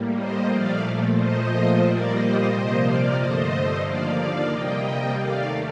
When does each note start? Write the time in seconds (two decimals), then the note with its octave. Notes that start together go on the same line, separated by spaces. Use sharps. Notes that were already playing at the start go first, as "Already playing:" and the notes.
Already playing: A2 G3 A#3
0.15 C5 D#5
0.48 A#2 F3 A3 D5 F5
1.15 A#2 F3 A3 C5 D#5
1.82 A#2 G3 A#3 A#4 D5
2.15 C5 D#5
2.49 C3 F3 A#3 C5 D#5
2.82 D5 F5
3.15 G2 D3 A3 C5 D#5
3.82 D#2 D3 F3 A#3 D5 F5
4.16 D5 F5
4.49 C3 G3 A#3 D#5 G5
5.16 D#2 D#3 A3 D5 F5